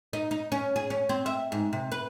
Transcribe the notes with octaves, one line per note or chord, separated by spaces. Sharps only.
D#4
D#4
C#4
G#4
C#4
C4
E5
G#2
C3
B4